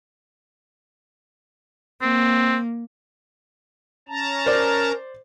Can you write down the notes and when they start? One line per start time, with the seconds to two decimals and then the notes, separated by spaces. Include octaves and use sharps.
2.02 A#3 C4
4.09 C#4 A5 A#5
4.46 A#4 C5 D5